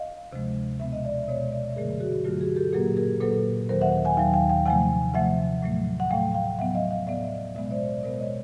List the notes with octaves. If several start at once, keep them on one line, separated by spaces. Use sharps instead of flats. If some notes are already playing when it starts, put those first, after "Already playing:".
Already playing: D#5 F5
D2 C3 F3 G#3
B2 G#3 B3 E5
D#5
D5 E5
B2 G#3 B3 C#5 D#5
D5 E5
G2 D3 F#3 A3 G#4 A#4
F#4 G#4
G2 D3 F#3 A3 F4 G4
F#4 G#4
G4 A4
A#2 F#3 A#3 G#4 A#4
G#4 A#4
A#2 F#3 A#3 A4 B4
D#2 D#3 F#3 A#4 C5
E5 F#5
F#5 G#5
D#2 D#3 F#3 F5 G5
F5 G5
F5 G5
C3 F3 A3 F#5 G#5
C3 F3 A3 E5 F#5
A2 F#3 A3
F#5
A2 F#3 A3 F5 G5
F5 G5
A2 F#3 B3 E5 F#5
D#5 F5
D#5 F5
A2 F#3 B3 D5 E5
B2 G#3 B3 D5 E5
C5 D5
B2 G#3 B3 A#4 C5
C#5 D#5